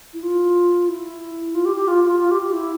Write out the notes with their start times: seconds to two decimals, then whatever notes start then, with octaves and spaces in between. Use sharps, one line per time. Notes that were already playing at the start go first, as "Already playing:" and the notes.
0.14 E4
0.23 F4
0.88 E4
1.55 F4
1.65 G4
1.76 G4
1.88 F4
2.04 F4
2.20 F4
2.31 G4
2.42 G4
2.53 E4